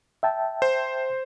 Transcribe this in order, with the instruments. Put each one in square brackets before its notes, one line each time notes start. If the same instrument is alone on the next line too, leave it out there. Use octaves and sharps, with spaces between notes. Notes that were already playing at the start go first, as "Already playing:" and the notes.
[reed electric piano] E5 G5 A5
[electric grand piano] C5